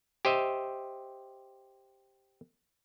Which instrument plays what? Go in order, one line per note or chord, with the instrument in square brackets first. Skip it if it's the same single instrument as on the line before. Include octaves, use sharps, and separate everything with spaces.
[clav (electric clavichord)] G4 C5 D#5 E5